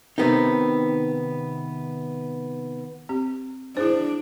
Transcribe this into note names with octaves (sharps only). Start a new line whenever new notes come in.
C3 D#3 B3 C4 D#4
C4 G4
D4 E4 G#4 C5